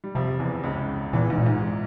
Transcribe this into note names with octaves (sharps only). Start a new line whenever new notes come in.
G3
F2 C3 F3
E2 E3
C#2 C#3
E2 A#2 E3
G#2
A#2
G#2